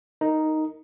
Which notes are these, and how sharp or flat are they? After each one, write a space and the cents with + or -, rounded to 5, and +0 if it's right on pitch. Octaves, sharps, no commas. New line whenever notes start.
D#4 +0 A#4 -20